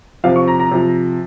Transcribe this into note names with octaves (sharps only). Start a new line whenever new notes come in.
C3 F3 F5
C#6
A#5
A#5
C3 F3